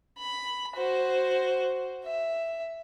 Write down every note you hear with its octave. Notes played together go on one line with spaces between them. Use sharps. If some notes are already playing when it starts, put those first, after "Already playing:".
B5
F#4 C5
E5